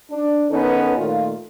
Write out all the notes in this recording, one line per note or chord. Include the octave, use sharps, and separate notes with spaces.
D4
D#3 B3 C#4 D#4 A4 B4
A#2 D#3 A3 F4